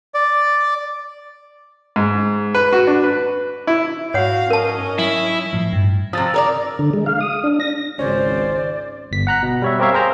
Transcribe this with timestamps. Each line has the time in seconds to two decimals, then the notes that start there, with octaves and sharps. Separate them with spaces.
0.14 D5
1.96 G#2
2.55 B4
2.73 F#4
2.87 D4
3.04 B4
3.67 E4
4.14 G#2 F#4 C#5 F5 F#5
4.50 C#4 A#4 D#5 A5
4.99 F#3 E4
5.53 A2 F3
5.73 G2
6.13 C3 F3 D#6 E6 A6
6.34 A#4 C#5 D5
6.79 D3
6.93 G#3
7.06 F5
7.21 D#6
7.44 D4
7.60 A#6
7.99 G#1 C#2 C#4 C5 D5
9.12 G1 B6
9.27 F#5 A#5 F#6
9.42 B2
9.62 G3 C#5 E5
9.79 C4 G4 A#4 C#5 E5 F5
9.93 G#4 A#4 C5 A#5